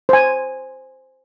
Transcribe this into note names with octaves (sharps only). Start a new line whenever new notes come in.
C5 G#5